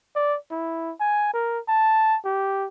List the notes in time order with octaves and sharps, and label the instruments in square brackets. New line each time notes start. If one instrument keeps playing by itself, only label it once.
[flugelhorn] D5
E4
G#5
A#4
A5
G4